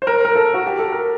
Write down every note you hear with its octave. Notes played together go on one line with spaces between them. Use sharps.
C5
A#4
A#4
A4
F#4
G4
A4
A#4